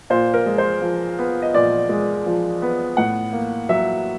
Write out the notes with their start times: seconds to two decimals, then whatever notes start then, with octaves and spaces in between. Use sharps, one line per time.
0.10 A#2 C5
0.34 A#4
0.46 G#3
0.58 C5
0.81 F3
1.19 B3
1.42 D#5
1.54 A#2 D5
1.89 G#3
2.26 F3
2.62 B3
2.97 A2 F#5
3.33 A#3
3.69 F#3 E5